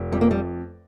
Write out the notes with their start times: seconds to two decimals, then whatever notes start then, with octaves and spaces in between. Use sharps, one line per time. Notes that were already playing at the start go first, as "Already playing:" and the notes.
Already playing: F1
0.12 F2 G3
0.21 A#3
0.31 G3